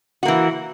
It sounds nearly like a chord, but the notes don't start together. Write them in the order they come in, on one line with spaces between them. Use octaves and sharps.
F#4 A#3 E3